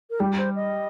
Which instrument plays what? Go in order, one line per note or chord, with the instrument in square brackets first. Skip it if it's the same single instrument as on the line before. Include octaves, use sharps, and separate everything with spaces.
[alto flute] A#4
[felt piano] G3 [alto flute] G4
[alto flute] C5
D#5